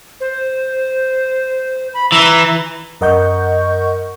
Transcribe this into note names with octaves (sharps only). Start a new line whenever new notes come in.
C5
B5
E3 A#5
F#2 A#4 D#5 F#5 C#6 G6